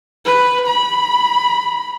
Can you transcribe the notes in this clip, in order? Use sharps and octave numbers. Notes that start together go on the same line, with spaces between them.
B4
B5